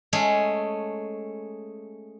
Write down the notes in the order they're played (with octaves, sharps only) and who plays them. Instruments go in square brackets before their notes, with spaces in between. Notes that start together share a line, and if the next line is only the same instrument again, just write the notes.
[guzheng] G#3 A3 C#4 G#4